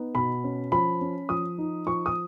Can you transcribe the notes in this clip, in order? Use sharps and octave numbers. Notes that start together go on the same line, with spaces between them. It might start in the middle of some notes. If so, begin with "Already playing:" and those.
Already playing: B3 D#4
B2 B5
C#4
F3 B5
C#4
F3 D#6
D#4
F3 C#6
D#6